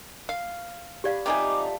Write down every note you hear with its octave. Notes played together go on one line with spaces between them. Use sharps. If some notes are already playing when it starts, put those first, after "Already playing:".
F5
D4 G4 B4 D5 F5
C3 F3 G3 A3 D#4 G#5 D6